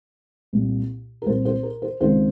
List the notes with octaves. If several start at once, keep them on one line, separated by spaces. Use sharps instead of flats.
C2 A#2
A#4
C2 A#2 C5
C5
A#4
C5
C#2 C3 D#3 C5